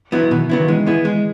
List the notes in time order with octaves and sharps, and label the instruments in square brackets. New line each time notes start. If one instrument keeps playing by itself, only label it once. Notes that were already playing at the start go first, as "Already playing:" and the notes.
[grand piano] E3 [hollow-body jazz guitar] F#3 B3 E4
[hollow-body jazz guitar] B2 [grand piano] D#3
[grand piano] C#3 [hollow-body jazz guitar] F#3 B3 E4
[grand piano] D#3
[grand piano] E3 [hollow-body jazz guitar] G#3
[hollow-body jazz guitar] B3 E4 G#4
G#3